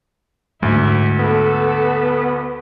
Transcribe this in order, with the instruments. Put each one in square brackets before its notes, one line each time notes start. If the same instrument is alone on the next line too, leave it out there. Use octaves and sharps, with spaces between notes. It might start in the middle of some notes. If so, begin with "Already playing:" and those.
[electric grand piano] D2 [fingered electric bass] G#2 G#3 [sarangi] E4
[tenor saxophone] B3 [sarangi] A4